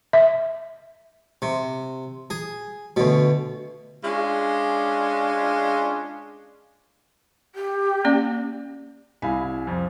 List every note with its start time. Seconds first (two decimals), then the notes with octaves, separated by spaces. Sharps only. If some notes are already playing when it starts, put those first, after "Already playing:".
0.13 E5
1.42 C3
2.30 G#4
2.96 D2 B2
4.04 G#3 C#4 D4 F4
7.55 G4
8.05 A#3 C#4 D5
9.22 C2 E4 F5 G#5 B5
9.67 F2